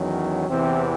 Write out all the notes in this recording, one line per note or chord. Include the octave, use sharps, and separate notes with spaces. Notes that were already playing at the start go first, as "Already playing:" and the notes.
Already playing: E2 D#3 F#3 C#4
E2 C3 E3 C4